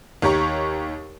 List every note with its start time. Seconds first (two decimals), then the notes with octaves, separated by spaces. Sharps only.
0.22 D#2 G4 C#5 A#5 C#6